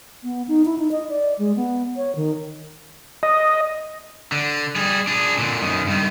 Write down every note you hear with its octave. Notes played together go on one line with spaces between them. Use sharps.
B3
D#4
E4
D#4
D#5
D5
G#3
B3
C#5
D#3
D#5
D3
G3 G#4
D4 G#4
A#2 D3
F#2 D#3
G2 D#3